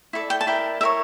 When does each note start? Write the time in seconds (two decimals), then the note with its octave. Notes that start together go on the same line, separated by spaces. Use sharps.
0.13 E4 A4 D5
0.30 G5
0.41 A5
0.47 E4 A#4 D5 G5
0.81 E4 A#4 C#5 E5